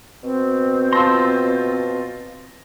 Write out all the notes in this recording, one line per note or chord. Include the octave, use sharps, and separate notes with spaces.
B2 C4
F4 A5 C6 E6 A#6